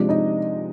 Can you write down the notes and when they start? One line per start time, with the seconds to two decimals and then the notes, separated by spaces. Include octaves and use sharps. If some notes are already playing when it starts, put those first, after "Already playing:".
Already playing: C3 F3 G#3 D4
0.09 D#4 D#5